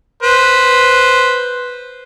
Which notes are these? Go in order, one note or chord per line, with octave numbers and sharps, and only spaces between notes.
B4 C5